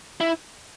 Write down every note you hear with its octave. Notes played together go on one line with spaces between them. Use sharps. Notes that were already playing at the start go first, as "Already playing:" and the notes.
E4